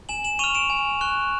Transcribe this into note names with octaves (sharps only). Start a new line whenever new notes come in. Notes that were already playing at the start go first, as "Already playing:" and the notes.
G#5 E7 F#7
E7 F#7
C#6 F6 D#7 F7
D7 E7
G#5
C#6 F#6